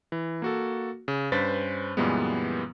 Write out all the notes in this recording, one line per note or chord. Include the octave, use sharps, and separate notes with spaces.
E3
A#3 F#4 A4
C#3
G2 C#4 B4 C5 A6 B6
F#2 A#2 E3 G3 G#3 B3